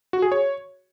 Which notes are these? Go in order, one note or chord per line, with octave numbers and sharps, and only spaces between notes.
F#4
G#4
C#5